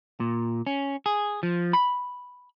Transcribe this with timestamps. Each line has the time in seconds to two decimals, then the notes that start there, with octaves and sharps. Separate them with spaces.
0.20 A#2
0.67 C#4
1.06 G#4
1.43 F3
1.73 B5